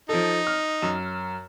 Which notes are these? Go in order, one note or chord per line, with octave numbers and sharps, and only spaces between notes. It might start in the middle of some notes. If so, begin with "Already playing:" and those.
F3 D#4 A4
F6
F#2